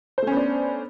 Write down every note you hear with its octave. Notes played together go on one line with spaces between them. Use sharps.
A3 B3 C#4 D4 C5